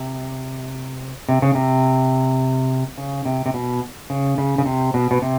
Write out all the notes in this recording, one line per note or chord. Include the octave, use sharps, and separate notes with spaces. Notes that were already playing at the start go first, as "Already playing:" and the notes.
Already playing: C3
C3
C#3
C3
C#3
C3
C3
B2
C#3
C#3
C#3
C3
B2
B2
C3